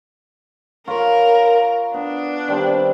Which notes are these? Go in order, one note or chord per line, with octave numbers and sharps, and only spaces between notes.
F4 A#4 C#5 B5
B3 D4
D#3 G3 C4